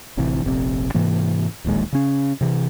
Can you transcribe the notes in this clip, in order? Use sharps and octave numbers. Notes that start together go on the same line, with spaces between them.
D1 A1 C3 E3
F1 A#1 F2 C3
G#2 C3 E3 A#3
D1 A#1 D#2 G#3
C#3 C#4
C3 E3